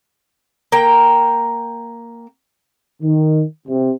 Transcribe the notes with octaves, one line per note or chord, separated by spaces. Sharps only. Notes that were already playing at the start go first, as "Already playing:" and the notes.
A#3 G5
D#3
C3